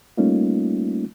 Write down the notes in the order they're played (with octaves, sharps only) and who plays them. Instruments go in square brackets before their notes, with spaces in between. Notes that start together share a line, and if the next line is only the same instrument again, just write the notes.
[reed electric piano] G3 A3 A#3 C#4 D#4 F4